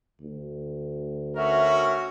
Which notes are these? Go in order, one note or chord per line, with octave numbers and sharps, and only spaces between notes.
D2
C#4 F#4 A#4 E5